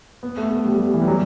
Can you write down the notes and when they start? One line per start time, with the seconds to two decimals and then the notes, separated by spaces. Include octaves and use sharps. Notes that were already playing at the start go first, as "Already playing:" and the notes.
0.23 B3
0.37 A3
0.51 A3
0.65 G3
0.79 G3
0.94 E3
1.02 G3
1.08 F#3